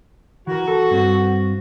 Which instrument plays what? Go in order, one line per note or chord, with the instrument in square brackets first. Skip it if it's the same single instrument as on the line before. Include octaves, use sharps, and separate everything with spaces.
[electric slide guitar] E3 A#4 [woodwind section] F#4
[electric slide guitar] A4
G2 C4